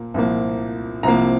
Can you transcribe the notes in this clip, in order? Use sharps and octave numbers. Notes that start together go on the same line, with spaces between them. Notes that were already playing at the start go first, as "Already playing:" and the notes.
Already playing: A#2 F3 A#3
C2 A#2 F3 A#3
C2 C3 F3 A#3 A#5